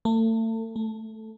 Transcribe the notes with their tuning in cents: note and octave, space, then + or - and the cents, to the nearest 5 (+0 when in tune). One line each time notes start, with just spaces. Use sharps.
A3 +35
A3 +0